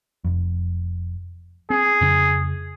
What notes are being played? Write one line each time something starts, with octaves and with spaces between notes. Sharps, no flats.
F1 F2
C4 G#4
F2 C#3 C4